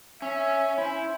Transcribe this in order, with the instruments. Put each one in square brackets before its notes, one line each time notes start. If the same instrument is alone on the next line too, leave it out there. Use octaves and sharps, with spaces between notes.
[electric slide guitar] C#4 [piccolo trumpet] E5
[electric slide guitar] E4 [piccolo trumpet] C5